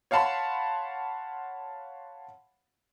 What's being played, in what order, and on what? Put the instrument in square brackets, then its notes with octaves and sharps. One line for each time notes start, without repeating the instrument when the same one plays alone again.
[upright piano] C#5 F5 F#5 A5 B5 C6